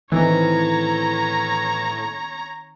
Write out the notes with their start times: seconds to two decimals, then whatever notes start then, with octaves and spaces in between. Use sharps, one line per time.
0.12 A2 D#3 E3 C4 D#4 C#5 A#5